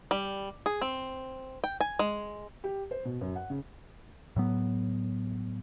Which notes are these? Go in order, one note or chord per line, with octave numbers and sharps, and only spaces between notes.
G3
G#4
C4
G5
G#5
G#3
G4
C5
B2
F#2
F#5
C#3
A2 F#3 B3